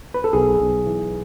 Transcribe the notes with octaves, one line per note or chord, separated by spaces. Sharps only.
B4
A4
B1 G#4
B1
E3